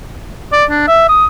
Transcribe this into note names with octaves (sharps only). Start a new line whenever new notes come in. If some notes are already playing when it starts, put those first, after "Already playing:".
D5
D4
E5
D#6